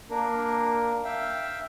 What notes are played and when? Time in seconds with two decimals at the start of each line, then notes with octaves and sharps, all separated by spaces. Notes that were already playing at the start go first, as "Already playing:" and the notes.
0.10 A#3 D4 A#4
1.04 E5 F5 G5